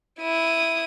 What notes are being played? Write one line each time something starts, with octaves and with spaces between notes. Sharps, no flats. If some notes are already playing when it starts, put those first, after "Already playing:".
E4 D#6